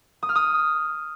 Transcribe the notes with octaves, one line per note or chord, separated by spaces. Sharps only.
D#6
F6
D#6